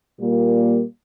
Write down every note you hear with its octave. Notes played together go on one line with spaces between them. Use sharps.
A#2 G3 A#3